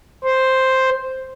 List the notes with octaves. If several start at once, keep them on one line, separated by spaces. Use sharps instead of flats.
C5